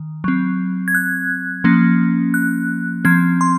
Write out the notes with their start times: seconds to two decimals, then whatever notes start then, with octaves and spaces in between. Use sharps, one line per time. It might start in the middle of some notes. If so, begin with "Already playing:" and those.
Already playing: D#3
0.24 F#3 C4
0.88 G#6
0.95 F#6
1.64 F3 A#3 C#4
2.34 F#6
3.05 F3 C4 G#6
3.41 C6